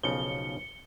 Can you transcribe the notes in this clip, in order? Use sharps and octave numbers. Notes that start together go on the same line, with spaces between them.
B1 C#3 F3 C#7 G7